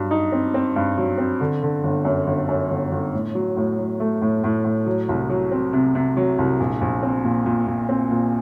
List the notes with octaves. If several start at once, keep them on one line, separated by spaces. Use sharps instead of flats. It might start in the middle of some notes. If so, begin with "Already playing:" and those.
Already playing: G2 F#3
D#4
C4
C4
G2
F#3
C4
D3
D3
G1
F#2
G1
F#2
G1
G1
A2
F#3
A2
F#3
A3
A2
A2
A2
F#3
C2
F#3
C4
C3
C3
F#3
C2
A#1
A#1
C4
A#2
A#2
A#2
C4
A#2